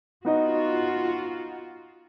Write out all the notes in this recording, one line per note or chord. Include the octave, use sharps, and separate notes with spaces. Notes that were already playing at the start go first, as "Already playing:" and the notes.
B3 D#4 F4 F#4 D#5